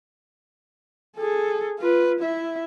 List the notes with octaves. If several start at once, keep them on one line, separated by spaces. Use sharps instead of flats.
G#4 A4
F4 B4
E4 E5